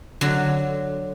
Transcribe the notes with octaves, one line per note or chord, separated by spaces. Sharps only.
D3 F#3